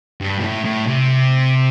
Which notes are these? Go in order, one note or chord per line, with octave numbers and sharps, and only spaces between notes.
G2
B2
A2
A2
C3